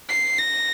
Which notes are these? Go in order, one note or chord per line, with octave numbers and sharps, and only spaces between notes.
C7
A#6